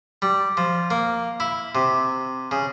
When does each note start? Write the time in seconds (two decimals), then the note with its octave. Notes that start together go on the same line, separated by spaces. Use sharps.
0.22 G3
0.57 F3
0.90 A#3
1.40 E4
1.75 C3
2.51 C#3